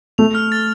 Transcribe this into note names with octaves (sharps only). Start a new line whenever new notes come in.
A3 F7
F6
A6